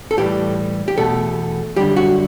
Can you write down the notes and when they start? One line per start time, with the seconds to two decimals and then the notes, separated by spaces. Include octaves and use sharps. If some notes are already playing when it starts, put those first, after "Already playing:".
0.11 A4
0.17 A2 E3 G3 G4
0.88 G4
0.97 E2 B2 A3 A4
1.76 F#2 D3 G3 G4
1.96 F#4